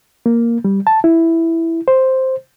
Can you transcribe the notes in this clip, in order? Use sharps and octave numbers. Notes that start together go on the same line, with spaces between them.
A#3
G3
A5
E4
C5